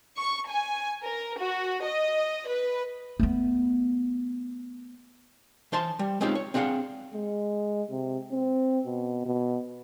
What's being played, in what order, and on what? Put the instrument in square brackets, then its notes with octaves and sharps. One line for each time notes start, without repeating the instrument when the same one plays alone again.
[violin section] C#6
G#5
A#4
F#4
D#5
B4
[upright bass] A3 B3
[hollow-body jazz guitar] E3 C5 A5 C6
G3
G#3 C4 C#4 D#4 F4 G4
C#5
C4 D4 G#4 F5 F#5
[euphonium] G#3
C3
C4
B2
B2